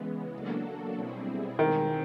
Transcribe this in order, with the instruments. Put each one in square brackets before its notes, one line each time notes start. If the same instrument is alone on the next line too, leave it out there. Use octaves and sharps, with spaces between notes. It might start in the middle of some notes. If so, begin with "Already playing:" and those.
Already playing: [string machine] C#3 E3 G#3 B3
F#3 A#3 D4 F#4 A4
B2 G3 C4 E4 G#4
[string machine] E2 B2 G#3 C4 E4 [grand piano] D#3